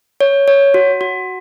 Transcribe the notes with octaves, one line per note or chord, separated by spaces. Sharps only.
C#5
C#5
F#4
F#4